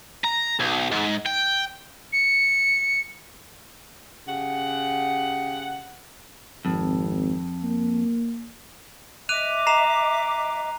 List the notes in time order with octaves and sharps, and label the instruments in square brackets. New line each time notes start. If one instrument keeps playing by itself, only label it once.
[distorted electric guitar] A#5
B1
G#2
G5
[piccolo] C#7
[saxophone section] C#3 G4 F#5
[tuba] G#1 [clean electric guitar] F2
[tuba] A#3
[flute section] D#5 E5 D6 [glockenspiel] F#6 D#7 F7
[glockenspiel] A#5 C7 F7